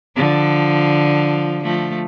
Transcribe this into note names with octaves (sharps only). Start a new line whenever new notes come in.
D3 F3
F3 A3